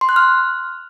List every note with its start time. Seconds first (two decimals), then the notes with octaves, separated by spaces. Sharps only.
0.01 C6
0.09 F#6
0.16 F6